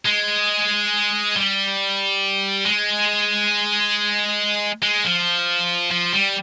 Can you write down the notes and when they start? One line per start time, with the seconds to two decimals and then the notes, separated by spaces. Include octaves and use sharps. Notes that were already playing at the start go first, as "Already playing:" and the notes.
0.05 G#3
1.36 G3
2.65 G#3
4.83 G#3
5.04 F3
5.91 F3
6.13 G3